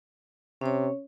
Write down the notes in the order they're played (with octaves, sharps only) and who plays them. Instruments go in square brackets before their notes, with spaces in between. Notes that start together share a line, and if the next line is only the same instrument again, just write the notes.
[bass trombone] C3 [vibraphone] C#4 C#5